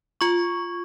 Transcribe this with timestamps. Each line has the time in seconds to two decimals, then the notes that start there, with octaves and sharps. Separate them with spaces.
0.21 F4 C#6